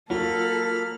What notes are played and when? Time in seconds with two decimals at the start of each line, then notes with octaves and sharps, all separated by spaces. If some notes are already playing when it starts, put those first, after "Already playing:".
0.10 F#3 A#3 F4 A4 B5 F6